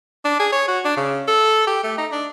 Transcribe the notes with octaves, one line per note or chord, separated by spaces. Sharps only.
D4
G#4
C#5
F#4
D4
C#3
A4
G4
A3
D#4
D4